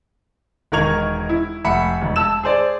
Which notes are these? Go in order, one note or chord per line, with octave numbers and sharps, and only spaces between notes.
E1 D#3 A#4 C#6 G#6 F7
E4
F1 E5 F#5 B5 C#7
E1
A5 E6 E7
G#4 C5 D5